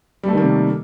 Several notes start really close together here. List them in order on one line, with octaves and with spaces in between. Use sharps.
G3 A3 D#3 A#3 C3